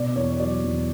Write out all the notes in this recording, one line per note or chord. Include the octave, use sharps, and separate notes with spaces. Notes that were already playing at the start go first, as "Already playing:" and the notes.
Already playing: B2 D5
E2 C#5
C#5
F#3 D5
E2